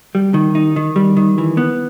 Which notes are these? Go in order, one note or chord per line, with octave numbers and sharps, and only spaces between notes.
G3
D#3
D#4
D#3
G3
D#3
E3
B3